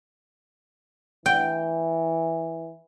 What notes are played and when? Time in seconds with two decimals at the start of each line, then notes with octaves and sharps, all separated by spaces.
1.26 E3 G5